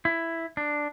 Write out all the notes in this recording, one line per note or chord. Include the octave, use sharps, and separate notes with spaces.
E4
D4